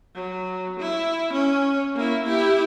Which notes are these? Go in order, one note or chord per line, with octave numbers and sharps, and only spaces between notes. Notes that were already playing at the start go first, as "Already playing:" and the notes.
F#3
E4
C#4
A#3 E4
E4 G4